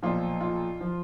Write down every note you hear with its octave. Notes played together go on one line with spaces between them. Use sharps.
B1 A#2 F3 F4
F4
F3